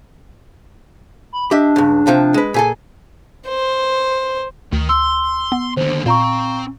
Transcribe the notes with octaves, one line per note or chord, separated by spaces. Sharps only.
B5
D4 G4 D#5 E5
C#2 G2
C3 F3 G5
G#3 B4
A#2 G#4 A4 G#5
C5
D2 D#3
C6 E6
B3
D#2 D3 C5
A#2 C4 F5 A#5 C#6